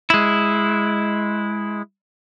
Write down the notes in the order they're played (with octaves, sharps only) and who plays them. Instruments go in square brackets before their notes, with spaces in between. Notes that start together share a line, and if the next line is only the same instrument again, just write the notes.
[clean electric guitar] G#3 E4